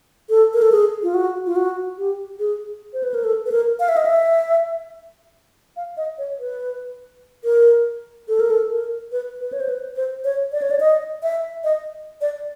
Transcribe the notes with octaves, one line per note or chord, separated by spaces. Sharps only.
A4
A#4
A4
G#4
F4
F#4
F4
F#4
G4
G#4
C5
B4
A#4
A4
B4
A#4
F5
E5
D#5
E5
F5
D#5
C#5
B4
A#4
A4
A#4
A4
A#4
B4
B4
C#5
C5
B4
C5
C#5
D5
C#5
D5
D#5
E5
D#5
D5